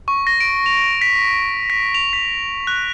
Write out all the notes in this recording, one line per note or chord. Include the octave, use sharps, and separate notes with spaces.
C#6
A#6
D7
F7
B6
B6
F7
B6
F#6